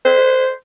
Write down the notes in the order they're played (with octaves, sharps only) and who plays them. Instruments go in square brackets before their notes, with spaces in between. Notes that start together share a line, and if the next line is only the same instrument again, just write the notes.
[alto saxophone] C5